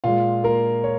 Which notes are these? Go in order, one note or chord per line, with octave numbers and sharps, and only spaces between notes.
A#2 G#3 F4 F5
A#3 A#4
C#5